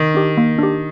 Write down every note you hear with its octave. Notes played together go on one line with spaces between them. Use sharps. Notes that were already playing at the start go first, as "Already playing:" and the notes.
Already playing: D#3
D4 G4
A#3
D4 G4